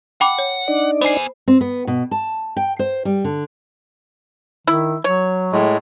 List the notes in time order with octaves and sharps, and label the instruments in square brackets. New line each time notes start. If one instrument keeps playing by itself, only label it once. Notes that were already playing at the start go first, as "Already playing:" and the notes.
[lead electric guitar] F#5 [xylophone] G5 B5 D6
[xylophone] C#5
[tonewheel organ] D4 D#4 D5
[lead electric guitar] B3 G#5 [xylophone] C5 C7
[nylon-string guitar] C4
B3
B2
A5
G5
C5
G3
D3
[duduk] D#3 [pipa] E4
[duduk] F#3 [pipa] C#5
[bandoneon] A2 G#3